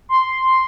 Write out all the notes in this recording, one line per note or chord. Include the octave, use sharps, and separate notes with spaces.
C6